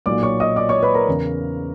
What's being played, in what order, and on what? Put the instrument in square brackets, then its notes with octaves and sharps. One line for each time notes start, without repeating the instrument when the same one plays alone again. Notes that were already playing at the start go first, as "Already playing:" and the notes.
[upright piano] B1 A#2 F#3 D5 D6
C#5 C#6
D#5 D#6
D5 D6
C#5 C#6
B4 B5
A#4 A#5
E2 C#3 E3